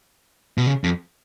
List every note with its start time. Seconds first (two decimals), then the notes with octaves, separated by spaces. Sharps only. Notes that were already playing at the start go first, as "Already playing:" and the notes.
0.58 B2
0.67 C#3
0.84 F2